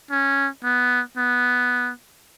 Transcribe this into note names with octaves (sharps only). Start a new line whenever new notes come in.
C#4
B3
B3